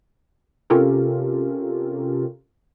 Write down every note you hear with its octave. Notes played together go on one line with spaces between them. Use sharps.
C3 C#4 F4 G4 A4 A#4